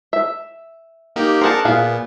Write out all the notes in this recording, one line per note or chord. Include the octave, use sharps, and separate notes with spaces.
E5
A#3 D#4 G4
D4 G#4 A#4 C5 F#5 A5
A#2 B3 G#4 F5